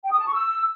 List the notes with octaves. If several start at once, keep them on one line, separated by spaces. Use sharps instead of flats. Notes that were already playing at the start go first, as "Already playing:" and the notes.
G5
D#6
A5
C#6
E6